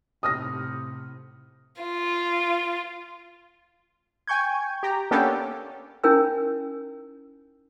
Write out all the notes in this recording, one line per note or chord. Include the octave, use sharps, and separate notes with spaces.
A2 C3 D#6 F6 A#6
F4
G5 G#5 C#6 G6 G#6
G4 A#5
A#3 B3 C#4 D4 G4 A4
C#4 D#4 E4 A#4 G#5 E6